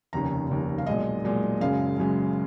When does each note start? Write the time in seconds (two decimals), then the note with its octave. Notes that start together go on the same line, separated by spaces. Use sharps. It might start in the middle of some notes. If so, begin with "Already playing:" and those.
0.13 F1 D#2 C#3 A#5
0.49 F1 D#2 C#3
0.78 F5
0.86 B1 A#2 G#3 D#5
1.24 B1 A#2 G#3
1.61 F#1 F#2 C#3 G#3 F5
1.98 F#1 F#2 C#3 G#3